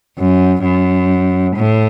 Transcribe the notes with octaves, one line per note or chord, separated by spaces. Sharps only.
F#2
F#2
A2